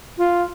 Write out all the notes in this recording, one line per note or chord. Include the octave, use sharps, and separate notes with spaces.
F4